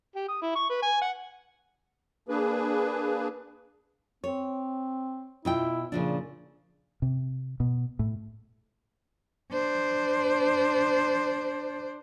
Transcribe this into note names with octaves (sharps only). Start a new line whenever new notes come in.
G4
D#6
E4
C#6
B4
G#5
F#5
A#3 D4 G#4 B4
C4 C#5
B2 E4 F4 G5
A#2 C#3 F3 D4
C3
B2
A2
D4 C5